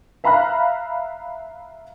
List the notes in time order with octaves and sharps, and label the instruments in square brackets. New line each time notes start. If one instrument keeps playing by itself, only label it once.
[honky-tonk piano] E5 F5 A#5 B5 F6 F#6